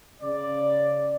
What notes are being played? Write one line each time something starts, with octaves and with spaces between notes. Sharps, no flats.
C#3 D5